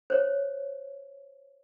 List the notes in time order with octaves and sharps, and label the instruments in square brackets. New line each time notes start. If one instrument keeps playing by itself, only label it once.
[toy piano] C5 C#5